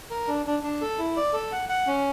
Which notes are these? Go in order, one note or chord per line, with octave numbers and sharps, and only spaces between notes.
A#4
D4
D4
D4
A4
E4
D5
A4
F#5
F#5
C#4